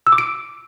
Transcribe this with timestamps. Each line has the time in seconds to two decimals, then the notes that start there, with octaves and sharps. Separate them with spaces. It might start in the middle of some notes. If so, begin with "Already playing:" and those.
0.07 E6
0.12 D6
0.18 D7